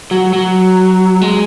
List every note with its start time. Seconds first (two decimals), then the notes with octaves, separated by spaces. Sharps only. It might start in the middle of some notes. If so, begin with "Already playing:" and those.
0.11 F#3
0.33 F#3
1.22 G#3